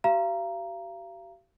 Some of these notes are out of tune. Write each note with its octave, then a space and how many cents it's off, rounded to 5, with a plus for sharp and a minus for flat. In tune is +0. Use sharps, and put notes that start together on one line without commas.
G4 -40 F5 -35 A#5 +0